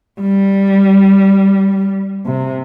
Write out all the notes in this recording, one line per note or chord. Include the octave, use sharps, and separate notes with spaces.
G3
C3